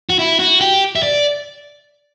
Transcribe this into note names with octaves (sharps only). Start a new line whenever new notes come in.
F#4
E4
F#4
G4
E5
D5